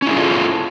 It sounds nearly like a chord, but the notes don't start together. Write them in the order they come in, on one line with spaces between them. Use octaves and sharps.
C#4 E4 G#4 F4 A4